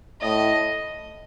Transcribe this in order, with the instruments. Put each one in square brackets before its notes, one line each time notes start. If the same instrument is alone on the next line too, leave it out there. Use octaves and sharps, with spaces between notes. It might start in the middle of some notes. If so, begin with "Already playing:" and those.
[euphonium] A2 [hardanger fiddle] D#5